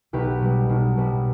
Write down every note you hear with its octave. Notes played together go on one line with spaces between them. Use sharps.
B1 G4 B4
B2 G3
B1
B2 G3